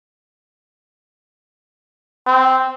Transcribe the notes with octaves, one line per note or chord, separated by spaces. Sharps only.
C4